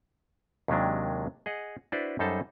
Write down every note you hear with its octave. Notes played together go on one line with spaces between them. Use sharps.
D#2 C3 D#3 F#3 G#3 D4
G#4 D#5 F#5
D4 E4 F#4 B4 C5 D5
F#2 G3 D#4 A4 C5 A5